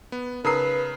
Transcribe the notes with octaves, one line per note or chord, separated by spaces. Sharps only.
B3
C#3 D#4 A#4 B4 A#5 D#6 C7